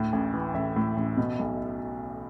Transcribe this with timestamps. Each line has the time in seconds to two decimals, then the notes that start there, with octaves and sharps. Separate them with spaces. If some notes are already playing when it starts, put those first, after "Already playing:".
Already playing: D2 A2
0.13 A1
0.34 E3
0.54 A1 E5
0.76 A2
0.97 A1
1.17 B2
1.39 B1